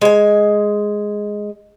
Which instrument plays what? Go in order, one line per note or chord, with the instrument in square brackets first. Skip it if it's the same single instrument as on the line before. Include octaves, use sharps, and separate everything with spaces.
[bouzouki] G#3 G#5